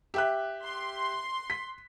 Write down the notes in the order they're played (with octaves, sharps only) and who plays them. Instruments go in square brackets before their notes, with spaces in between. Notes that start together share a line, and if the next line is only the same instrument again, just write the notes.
[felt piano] G4 E5 F#6
[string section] C6
[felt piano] B6